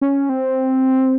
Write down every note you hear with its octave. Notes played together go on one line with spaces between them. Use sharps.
C#4
C4